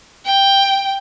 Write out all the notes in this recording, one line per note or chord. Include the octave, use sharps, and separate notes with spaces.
G5